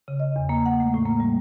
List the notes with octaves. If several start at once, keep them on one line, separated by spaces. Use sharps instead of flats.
C#3
D#5
E2
A#3
F#5
A3
A2
A#3
G3